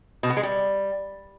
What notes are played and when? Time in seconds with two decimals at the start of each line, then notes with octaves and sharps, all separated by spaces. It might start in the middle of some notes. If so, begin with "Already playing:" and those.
0.23 B2
0.30 B3
0.37 G#3
0.43 G3